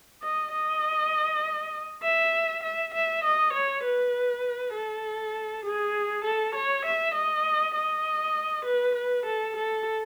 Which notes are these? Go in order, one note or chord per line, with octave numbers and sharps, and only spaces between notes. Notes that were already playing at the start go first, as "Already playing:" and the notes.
D#5
D#5
E5
E5
E5
D#5
C#5
B4
A4
G#4
A4
C#5
E5
D#5
D#5
B4
B4
A4
A4